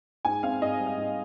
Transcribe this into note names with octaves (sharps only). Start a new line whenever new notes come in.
G#2 G#5
C4 F5
G#2 D#5
G3
F5
G#2